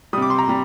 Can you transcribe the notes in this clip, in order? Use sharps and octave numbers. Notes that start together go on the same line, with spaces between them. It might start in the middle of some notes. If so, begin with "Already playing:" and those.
C3 G3 D6 D#6
C6
A#5
C3 G3